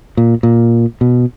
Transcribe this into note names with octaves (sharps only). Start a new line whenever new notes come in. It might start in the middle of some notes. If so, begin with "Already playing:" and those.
A#2
A#2
B2